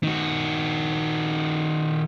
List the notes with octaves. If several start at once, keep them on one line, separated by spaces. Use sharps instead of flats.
D#3 F#4